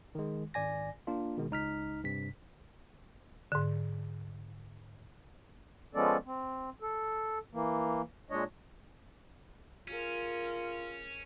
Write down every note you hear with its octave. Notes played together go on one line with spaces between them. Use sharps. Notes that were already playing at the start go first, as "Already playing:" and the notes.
D#3 G#3
G#1 D5 G#5 A#6
A#3 D4 F4
B2 D#3 G#3
C#2 D#4 F6 B6
G2 C3 B6
G#2 D3
F3 G#3 B3 C#4 A4 D5
C4
A4
E3 A#3
A#2 G#3 D4 C#5 D#5
C#4 F4 G#4 A#4